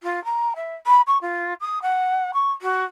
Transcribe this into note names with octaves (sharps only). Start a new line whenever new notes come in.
F4
A#5
E5
B5
C#6
F4
D#6
F#5
C#6
F#4